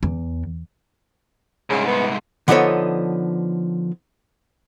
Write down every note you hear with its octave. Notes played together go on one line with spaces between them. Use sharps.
E2
C2 G#2 C#3
B3
D3 F3 B3 D#4 A4 C#5